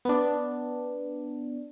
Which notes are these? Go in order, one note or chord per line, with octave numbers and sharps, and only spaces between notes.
B3 D4